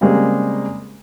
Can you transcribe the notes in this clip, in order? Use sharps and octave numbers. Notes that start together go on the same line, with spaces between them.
C#3 G3 G#3 A#3 C4